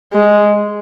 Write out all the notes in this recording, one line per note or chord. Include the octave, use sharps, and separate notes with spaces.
G#3